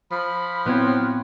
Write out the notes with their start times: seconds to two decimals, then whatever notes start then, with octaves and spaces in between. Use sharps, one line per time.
0.11 F3 B5
0.66 A2 B3 C4 F#4 C#5